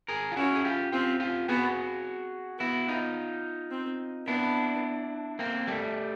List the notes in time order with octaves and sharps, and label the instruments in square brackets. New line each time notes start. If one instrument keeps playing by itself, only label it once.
[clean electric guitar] G#4 A#4
F4
[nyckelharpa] C#4 [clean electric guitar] E4 F#4
[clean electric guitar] G#4
F4 G4
[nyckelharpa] C4 [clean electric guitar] F4 G4
[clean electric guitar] F4 G4
[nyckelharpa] B3 [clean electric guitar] F#4 G#4
[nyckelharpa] B3 [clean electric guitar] E4 F#4
[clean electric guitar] D#4 F4
[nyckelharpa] C4
[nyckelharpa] B3 [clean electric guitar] D4 E4
[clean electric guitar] A#3 C4
G3 A3